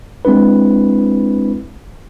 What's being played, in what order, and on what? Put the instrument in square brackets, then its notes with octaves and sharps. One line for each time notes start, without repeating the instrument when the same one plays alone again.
[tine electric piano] G#3 C4 D4 E4 B4